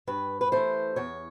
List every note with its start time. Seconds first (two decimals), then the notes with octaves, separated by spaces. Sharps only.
0.07 G2 B4
0.41 B4
0.52 E3 A3 C5
0.96 E2 C#5